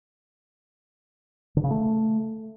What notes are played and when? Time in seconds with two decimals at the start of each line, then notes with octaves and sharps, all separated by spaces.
1.57 D3
1.64 C#3
1.71 A3